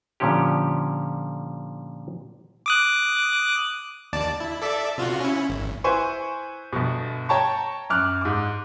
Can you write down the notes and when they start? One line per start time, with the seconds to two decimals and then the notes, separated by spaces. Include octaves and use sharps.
0.20 A#2 D3 F3 C#4 G4
2.66 D6 D#6 F#6
4.13 D#2 D5 A5
4.40 E4
4.62 A4 D5 E5
4.98 C3 F4 F#4
5.20 C#4 E4
5.49 G#1
5.84 E4 B4 C5 G#5 C#6
6.73 G1 B2
7.29 C#5 G5 A5 A#5 C#6
7.90 F#2 D6 F6 F#6
8.21 G#2 D6